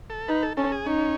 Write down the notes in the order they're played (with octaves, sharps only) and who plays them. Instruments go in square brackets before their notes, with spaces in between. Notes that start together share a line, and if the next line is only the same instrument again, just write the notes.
[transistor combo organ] A4
[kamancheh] D#4 [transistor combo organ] B4
[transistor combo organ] A4
[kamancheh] C#4 [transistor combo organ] A4
[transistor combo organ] G#4
[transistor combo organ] C#4 [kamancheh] D#4